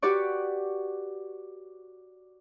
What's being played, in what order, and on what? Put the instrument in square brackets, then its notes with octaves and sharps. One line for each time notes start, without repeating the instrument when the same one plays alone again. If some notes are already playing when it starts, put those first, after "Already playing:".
[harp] F#4 G4 B4 D5 C#6